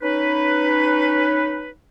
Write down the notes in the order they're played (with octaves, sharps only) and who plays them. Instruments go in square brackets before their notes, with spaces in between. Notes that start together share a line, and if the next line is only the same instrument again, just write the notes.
[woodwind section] C#4 D#4 B4